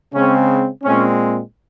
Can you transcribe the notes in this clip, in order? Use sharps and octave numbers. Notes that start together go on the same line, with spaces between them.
C#3 G#3 C4 C#4
A#2 G#3 C4 C#4